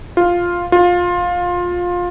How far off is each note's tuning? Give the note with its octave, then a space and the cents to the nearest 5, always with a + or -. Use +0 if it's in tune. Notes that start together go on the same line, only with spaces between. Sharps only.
F4 +5
F4 +20